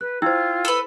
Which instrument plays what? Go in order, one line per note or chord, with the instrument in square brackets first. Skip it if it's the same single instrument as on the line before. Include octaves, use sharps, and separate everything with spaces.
[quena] B4 [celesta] F#6
[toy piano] E4 C5 [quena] F4 [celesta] G5 E6 G#6
[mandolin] A4 B4